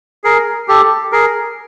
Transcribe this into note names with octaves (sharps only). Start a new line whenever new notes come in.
G#4 A#4
G4 A4
G#4 A#4